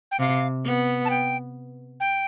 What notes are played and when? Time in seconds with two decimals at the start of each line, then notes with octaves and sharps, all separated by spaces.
0.11 G5
0.19 C3 F5
0.65 B3
1.05 A5
1.10 G5
2.00 G5